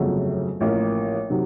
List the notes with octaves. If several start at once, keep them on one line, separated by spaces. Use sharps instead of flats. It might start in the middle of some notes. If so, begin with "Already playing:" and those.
Already playing: G1 F2 C#3 F#3 A3
A1 A2 F3 A#3
C3 D#3 F#3